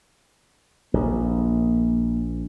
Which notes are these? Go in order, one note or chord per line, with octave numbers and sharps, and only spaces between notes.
A#1 A#3